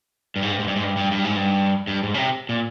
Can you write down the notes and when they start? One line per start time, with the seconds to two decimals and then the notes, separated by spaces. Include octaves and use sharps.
0.36 G2
0.43 G#2
0.51 G2
0.59 G#2
0.68 G2
0.76 G#2
0.83 G2
0.97 G2
1.11 G2
1.25 G#2
1.36 G2
1.87 G2
2.03 G#2
2.14 C#3
2.18 C3
2.49 A#2